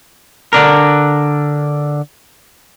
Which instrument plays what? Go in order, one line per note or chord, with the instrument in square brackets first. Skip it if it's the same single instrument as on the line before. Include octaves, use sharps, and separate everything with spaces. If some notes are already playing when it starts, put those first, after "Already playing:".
[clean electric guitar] D3 D4 A#4